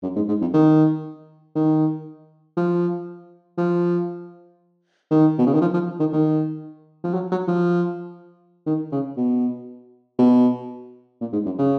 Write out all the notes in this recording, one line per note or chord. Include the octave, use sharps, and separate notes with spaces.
F#2
G#2
G#2
F2
D#3
D#3
F3
F3
D#3
B2
C#3
D#3
F3
F3
D#3
D#3
F3
F#3
F#3
F3
D#3
C#3
B2
B2
A#2
G#2
F#2
C#3